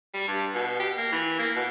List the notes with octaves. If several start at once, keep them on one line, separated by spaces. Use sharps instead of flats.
G3
G2
B2
G4
A#3
E3
A#3
B2